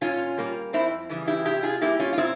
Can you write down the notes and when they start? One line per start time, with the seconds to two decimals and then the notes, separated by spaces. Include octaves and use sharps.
0.01 A#2 C#4 F4
0.38 G3 A#3
0.73 F2 C4 E4
1.09 C#3 E3 G3
1.27 E4 G4
1.45 C3 E4 G4
1.63 F4 G#4
1.81 G3 A#3 E4 G4
1.99 C#4 F4
2.13 F4
2.18 A#2 C4 E4